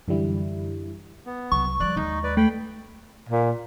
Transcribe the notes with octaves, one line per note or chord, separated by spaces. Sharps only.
F#2 D3 E3 G3 E4
B3
C2 F#3 C#6
F3 G3 D5 F#6
D#2 G#3 D#4
B4 D5
A3 G5 B5
A#2